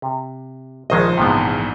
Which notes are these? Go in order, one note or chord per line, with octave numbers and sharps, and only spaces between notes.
C3
A#1 D#3 F3 G#3 C5 D#5
A#1 E2 G#2 C3 F3 B3